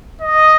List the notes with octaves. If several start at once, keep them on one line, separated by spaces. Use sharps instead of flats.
D#5